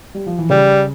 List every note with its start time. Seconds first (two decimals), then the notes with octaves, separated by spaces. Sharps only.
0.15 G3
0.26 F3
0.39 E3
0.50 C#3 G3